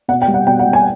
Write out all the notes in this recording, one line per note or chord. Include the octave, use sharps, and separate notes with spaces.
B2 F#5
G5
G3
F#5
B2 G5
F#5
G3
G#5